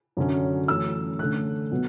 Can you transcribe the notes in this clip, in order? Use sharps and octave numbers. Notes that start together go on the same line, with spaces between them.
F#2 D3 F#3 C#4
F#2 E3 A3 C#4 E6
D3 A3 C#4 F#6
B2 F#3 B3